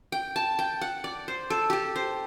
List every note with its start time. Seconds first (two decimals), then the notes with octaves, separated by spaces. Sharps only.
0.12 G5
0.36 A5
0.59 G5
0.81 F#5
1.04 D5
1.28 C5
1.50 A4
1.70 G4 A4
1.96 C5